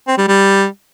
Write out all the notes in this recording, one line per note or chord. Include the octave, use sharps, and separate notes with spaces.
C4
G3
G3